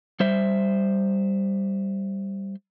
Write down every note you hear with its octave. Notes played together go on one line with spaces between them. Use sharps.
G3 C5 E5